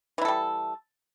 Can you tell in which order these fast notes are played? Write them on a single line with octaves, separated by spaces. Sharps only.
E3 E4 A4 G3